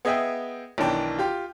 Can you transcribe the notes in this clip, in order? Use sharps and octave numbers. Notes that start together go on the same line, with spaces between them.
B3 G#4 D#5 E5 G5
B1 D#3 E3 D4 G5
F4 G4